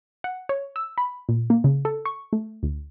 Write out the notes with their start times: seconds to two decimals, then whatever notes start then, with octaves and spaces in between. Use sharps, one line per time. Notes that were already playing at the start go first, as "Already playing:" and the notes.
0.24 F#5
0.49 C#5
0.76 E6
0.98 B5
1.29 A#2
1.50 A#3
1.64 C#3
1.85 A4
2.05 C#6
2.33 A3
2.63 D2